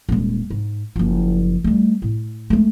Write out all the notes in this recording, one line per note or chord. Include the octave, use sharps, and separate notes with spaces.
D#1 G#3
G#2
F#1 F3
G3 A3
A2
G#3 A3